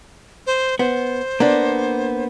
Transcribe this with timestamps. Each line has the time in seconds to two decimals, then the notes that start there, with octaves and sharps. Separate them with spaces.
0.47 C5
0.79 B3 C5
1.40 A#3 B3 D4